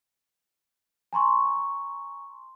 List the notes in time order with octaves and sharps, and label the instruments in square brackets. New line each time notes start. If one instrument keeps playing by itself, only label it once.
[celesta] G#5 A#5 C6 C#6